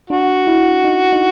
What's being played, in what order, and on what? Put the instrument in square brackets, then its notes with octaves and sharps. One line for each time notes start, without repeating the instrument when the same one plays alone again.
[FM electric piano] D4 [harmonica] F#4
[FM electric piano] E4
D#4
D#4